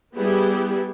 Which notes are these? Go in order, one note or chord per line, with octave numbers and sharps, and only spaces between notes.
G3 B3 E4 G4 G#4